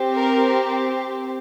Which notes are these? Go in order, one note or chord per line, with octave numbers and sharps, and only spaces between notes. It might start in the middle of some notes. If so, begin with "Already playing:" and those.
Already playing: C4 G4
A#4